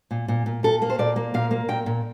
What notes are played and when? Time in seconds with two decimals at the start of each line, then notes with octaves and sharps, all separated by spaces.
0.11 A#2
0.28 A#2
0.46 A#2
0.63 A#2 A4
0.82 A#3
0.90 C5
0.99 A#2 D5
1.16 A#3
1.34 A#2 F5
1.51 A#3
1.68 A#2 G5
1.86 A#2